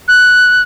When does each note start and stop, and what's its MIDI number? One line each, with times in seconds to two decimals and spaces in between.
0.08 0.62 90